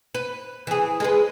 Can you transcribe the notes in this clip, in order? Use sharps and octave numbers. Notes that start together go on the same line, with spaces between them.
B4
E3 G#4
G#3 G#4 B4